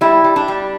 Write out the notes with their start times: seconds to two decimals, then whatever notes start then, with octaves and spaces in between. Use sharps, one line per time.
0.01 G3 E4
0.24 G3
0.36 D4
0.48 G3